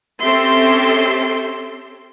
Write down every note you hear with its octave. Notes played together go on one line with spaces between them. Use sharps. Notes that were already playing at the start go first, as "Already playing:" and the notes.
C4 C#4 G4 A4 E5 C6